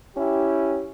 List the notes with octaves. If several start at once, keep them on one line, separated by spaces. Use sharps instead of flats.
C#4 E4 G4